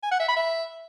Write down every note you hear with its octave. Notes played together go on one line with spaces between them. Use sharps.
G#5
F#5
E5
B5
E5